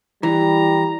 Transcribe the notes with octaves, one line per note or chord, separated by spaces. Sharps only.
E3 G3 A#5